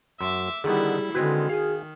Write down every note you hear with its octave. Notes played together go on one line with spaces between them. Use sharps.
F#2 E5 C6 D6
D3 D#3 G3 B3 E4 G#4
D3 D#3 G#3 C4 F#4 B4 G#6
G#4 F5 G#5